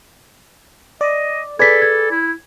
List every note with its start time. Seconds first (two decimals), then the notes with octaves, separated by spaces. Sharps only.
1.01 D5 D#5
1.59 G#4 A4 B4 D5 G#6 B6
1.82 G#6
2.11 E4